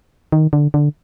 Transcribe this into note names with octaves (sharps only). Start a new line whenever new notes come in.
D#3
D3
D3